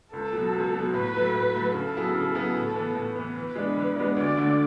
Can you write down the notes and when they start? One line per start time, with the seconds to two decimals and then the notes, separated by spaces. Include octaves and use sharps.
0.13 C#2 A4
0.33 B2 F#3
0.53 C#2
0.74 B2 F#3
0.94 A2 B4
1.14 F#3 A3
1.35 A2
1.54 F#3 A3
1.74 C#3 A4
1.95 F#3 B3 E4 G#4
2.15 C#3
2.35 F#3 B3 E4 G#4
2.55 A2 A4
2.75 E3 B3
2.95 A2
3.16 E3 B3
3.36 E3 B4
3.55 G#3 B3 D4
3.76 E3
3.96 G#3 B3 D4
4.16 D2 D5
4.37 D3 A3